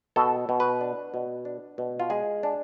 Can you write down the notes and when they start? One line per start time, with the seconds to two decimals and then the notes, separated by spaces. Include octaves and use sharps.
0.16 B2 A4
0.49 B2
0.60 B4
0.81 D4
1.14 B2
1.45 D4
1.78 B2
2.00 F4
2.10 G#3 G#4
2.43 D4